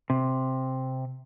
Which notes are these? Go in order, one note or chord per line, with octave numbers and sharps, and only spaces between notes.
C3